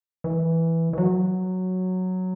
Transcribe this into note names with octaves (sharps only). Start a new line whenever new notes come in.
E3
E3
F#3